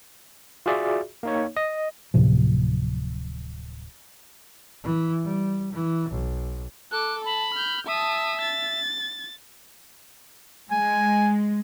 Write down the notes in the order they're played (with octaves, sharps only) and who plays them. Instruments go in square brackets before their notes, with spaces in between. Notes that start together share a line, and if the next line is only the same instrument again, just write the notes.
[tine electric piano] F4 F#4 G#4 D5 E5
A#3 D#4 C#5
D#5
[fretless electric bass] D1 A2 C3 F3
[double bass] E3
G3
E3
B1
[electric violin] A4 D6 [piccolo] F#6
[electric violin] A5 [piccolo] B5
[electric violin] F6 G6
[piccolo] E5 [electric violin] A5 D#6
[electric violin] A6
[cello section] G#3 [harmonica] G#5